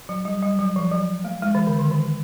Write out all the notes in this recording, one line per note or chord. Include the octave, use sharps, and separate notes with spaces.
F#3
G3
G3
F#3
F3
F#3
A3
G#3
E3
D3
D#3
E3